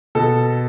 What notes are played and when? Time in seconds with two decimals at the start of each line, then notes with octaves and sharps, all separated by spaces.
0.15 B2 A4